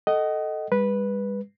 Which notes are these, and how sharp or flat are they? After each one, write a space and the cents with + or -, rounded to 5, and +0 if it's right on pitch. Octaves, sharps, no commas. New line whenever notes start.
A4 +0 D#5 +0 F#5 +35
G3 +45 B4 -10